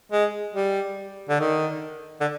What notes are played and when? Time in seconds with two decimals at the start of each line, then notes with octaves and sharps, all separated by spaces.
0.12 G#3
0.55 G3
1.30 D3
1.40 D#3
2.21 D3